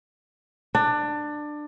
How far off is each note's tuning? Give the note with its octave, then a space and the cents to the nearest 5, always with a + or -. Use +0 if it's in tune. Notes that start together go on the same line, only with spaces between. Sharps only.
D4 +20